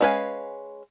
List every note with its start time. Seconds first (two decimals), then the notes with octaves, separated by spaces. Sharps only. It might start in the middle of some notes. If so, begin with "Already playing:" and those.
0.01 G#3 C#4 B4 F5 G#5